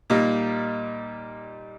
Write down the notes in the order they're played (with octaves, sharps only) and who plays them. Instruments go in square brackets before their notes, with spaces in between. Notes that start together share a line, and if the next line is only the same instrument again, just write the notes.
[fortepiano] A#2 G3 A#3 D#4